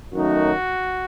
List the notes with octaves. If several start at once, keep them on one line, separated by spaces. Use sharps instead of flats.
F#2 D#3 F#3 A3 D#4 F#4